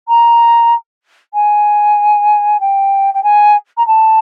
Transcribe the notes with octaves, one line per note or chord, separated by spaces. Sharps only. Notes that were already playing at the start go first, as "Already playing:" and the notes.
A#5
G#5
G5
G5
G#5
A#5
A5